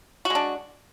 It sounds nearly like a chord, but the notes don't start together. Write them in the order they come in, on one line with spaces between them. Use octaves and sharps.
F#4 G#3 D4